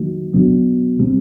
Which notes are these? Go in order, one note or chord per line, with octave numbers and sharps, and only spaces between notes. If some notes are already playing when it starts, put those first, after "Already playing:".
Already playing: D#3 F#3 A#3 D#4 F#4
B2 F#3 B3 D4 F#4
B2 G3 C4